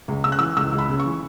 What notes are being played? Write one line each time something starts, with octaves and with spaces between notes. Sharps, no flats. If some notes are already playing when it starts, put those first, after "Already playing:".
C#2
C#3 E6
F#6
E3 E6
C#2 E6
C#2
B5
C#3
C#6
E3